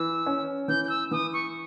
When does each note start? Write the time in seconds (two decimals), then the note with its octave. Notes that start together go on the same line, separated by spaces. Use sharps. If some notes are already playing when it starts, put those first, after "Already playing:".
Already playing: E3 E6
0.26 C#4
0.68 E3 G6
0.85 G6
0.90 E6
1.11 E3 D#6
1.33 C#6